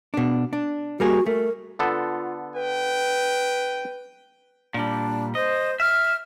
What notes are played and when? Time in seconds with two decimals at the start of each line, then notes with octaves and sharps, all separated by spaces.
0.14 B2 D4
0.53 D4
1.00 G3 A#3 F#4 G#4
1.26 A3 A#4
1.79 D3 B3 F4 A4
2.56 B4 G5
4.74 A#2 G3 D4
5.35 C5 D#5
5.80 E5 F6